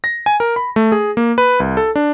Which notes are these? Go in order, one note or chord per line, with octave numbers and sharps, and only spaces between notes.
A#6
G#5
A#4
B5
A3
G#4
A#3
B4
C2
A4
D4